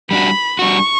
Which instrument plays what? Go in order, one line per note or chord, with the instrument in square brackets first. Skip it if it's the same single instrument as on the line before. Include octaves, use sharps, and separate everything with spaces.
[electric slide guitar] G3 D4 F#4 [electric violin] B5
[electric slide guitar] G3 D4 F#4 [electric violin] C#6